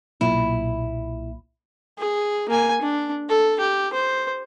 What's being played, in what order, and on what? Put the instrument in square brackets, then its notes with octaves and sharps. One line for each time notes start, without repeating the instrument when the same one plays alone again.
[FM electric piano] B1 A#2 [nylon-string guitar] E4
[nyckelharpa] G#4
A#3 G#5
D4
A4
G4
C5